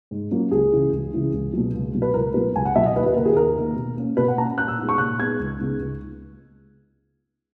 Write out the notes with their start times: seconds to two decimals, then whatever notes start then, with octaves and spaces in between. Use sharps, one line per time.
0.11 G#2
0.31 F#3 A#3 C#4
0.51 C#2 G#4
0.72 C#3 E3 G#3
0.93 C#2
1.13 C#3 E3 G#3
1.34 C#2
1.53 B2 F#3
1.74 C#2
1.94 B2 F#3
2.02 B4
2.14 C#2 A#4
2.34 B2 F#3 B3 B4
2.55 C#2 G#5
2.65 F#5
2.76 B2 F#3 B3 E5
2.86 D#5
2.96 D#2 B4
3.06 B4
3.16 D#3 A#3 A#4
3.25 G#4
3.36 D#2 A#4
3.57 D#3 A#3
3.76 B2
3.98 A#3 C#4
4.17 B2 B4
4.28 F#5
4.38 A#3 C#4 A#5
4.58 A#2 F#6
4.68 E6
4.78 G#3 B3 D#4
4.89 C#6
4.98 A#2 F#6
5.19 G#3 B3 D#4 G#6
5.39 C#2
5.60 C#3 G#3 B3 D#4
5.80 C#2